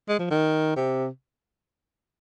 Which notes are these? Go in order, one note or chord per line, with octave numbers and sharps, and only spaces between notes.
G#3
F3
D#3
C3